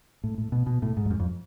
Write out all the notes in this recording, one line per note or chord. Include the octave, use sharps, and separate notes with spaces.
A2
A2
B2
B2
A2
G#2
F2
F#2
F2